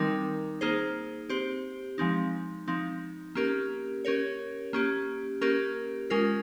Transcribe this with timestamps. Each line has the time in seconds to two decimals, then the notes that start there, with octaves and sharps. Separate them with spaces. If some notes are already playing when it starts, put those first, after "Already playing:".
Already playing: D#3 G3 C4 D#4 A#4
0.61 A#3 D#4 G#4 C5
1.29 C4 G4 C5
1.98 F3 G#3 C4 D#4
2.68 F3 C4 D#4
3.35 A#3 C#4 G4 A#4
4.05 C#4 G4 A#4 C#5
4.73 A#3 C#4 G4
5.41 A#3 C#4 G4 A#4
6.10 G#3 C#4 F4 A#4